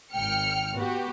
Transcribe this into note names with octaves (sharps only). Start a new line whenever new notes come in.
G#1 G5 F6 C#7
B3 F#4 G4